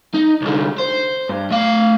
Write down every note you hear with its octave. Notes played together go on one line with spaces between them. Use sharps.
D#4
C2 D3
C5
G2
A3 F5